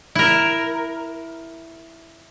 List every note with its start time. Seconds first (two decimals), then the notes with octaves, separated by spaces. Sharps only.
0.15 E4 A#4